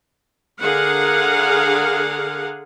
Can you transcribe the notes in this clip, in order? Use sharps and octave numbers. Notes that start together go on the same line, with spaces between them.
D3 G#4 A#4 F5 F#5